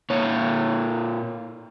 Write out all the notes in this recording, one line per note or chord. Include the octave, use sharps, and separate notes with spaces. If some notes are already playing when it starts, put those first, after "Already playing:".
A#2 C#5